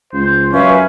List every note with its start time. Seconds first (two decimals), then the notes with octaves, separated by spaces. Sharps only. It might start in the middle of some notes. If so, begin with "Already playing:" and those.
0.13 C#2 C5
0.53 F#2 C#4 B4 E5 F5